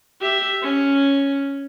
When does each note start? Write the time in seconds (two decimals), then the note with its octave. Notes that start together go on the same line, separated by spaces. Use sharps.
0.21 G4 E5
0.62 C#4